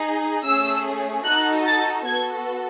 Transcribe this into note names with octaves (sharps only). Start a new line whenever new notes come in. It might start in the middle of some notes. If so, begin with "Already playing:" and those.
Already playing: D#4 G#4
A3 C#4 G#4 E6
D#4 F#4 A4 F#6
A6
B3 F#4 A4 G#6